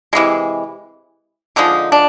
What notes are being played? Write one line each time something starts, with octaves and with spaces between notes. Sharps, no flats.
C3 E3 G#3
D3 F3 G#3 D#4
D4